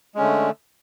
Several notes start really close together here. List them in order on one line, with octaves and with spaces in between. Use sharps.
G#3 C#4 D3 A3